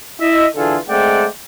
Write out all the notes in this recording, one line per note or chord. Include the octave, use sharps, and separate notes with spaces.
E4 D#5 E5
D3 E3 F4 G#4 A4
G#3 A3 C4 D5 F#5 G5